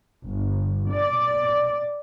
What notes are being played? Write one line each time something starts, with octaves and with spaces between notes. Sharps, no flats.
G1
D5